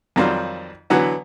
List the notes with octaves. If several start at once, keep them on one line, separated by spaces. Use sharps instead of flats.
F2 D#3 F#3 G3 C4 F4
D3 E3 F#3 B3 F#4